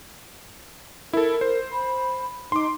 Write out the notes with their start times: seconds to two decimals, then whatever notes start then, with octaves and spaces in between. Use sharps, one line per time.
1.13 E4 A4 A#4
1.41 C5
1.72 B5
2.52 D#4 C6 D6